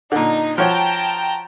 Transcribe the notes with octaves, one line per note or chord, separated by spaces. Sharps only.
A#2 D3 D#4
F3 F#4 C#5 G5 A5 A#5